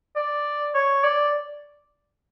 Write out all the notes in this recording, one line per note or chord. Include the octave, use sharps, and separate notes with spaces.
D5
C#5
D5